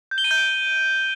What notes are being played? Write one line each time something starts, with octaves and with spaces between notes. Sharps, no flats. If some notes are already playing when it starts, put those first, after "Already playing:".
G6
G7
D#7
G6
D7